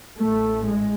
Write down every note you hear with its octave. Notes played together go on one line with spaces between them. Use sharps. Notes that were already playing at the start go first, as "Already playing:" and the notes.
A1 A2 A3
G#3